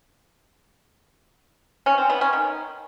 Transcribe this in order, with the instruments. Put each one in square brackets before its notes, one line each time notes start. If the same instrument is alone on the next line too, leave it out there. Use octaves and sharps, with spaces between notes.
[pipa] C#4
C4
B3
C#4
D#3